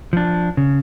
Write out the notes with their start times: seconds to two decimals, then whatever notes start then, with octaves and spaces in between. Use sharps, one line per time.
0.13 F3 D4
0.57 C#3